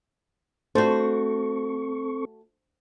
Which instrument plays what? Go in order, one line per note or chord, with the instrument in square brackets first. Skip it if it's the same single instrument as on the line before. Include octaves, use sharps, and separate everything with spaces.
[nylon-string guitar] A3 F#4 [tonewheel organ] C4 A4 C#6 [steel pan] D4 C5 A5